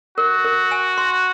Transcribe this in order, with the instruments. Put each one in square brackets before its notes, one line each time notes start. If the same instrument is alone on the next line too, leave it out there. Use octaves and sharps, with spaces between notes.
[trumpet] F#4 [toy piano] A#4
[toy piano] A#4
G#5
C6